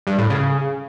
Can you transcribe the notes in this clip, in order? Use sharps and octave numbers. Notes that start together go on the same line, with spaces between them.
G2
A2
C#3